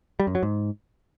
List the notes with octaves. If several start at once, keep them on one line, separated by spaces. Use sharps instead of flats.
G3
F#2
F#3
G#2